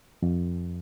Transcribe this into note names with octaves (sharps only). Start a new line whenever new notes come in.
F2